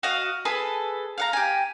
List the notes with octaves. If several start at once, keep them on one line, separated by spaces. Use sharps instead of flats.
F#4 D#5 F5
G#4 A4 B4
F5 F#5 A#5
G4 G#5